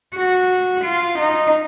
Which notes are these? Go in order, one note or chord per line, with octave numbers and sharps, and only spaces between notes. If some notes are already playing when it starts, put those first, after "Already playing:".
F#4
F4
D#4